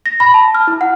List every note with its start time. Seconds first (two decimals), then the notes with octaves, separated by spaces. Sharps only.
0.06 A#6
0.20 B5
0.34 A5
0.55 F6
0.67 E4
0.81 F#5